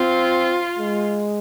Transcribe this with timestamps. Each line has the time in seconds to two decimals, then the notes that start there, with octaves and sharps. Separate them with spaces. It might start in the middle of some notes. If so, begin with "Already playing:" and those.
Already playing: C4 F4
0.78 G#3